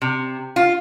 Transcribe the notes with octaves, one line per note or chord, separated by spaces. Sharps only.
C3
F4